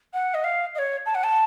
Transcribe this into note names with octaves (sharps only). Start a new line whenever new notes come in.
F#5
D#5
F5
D#5
C#5
A5
F#5
A5